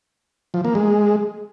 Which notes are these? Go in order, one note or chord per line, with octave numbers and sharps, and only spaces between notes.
F3
A#3
G#3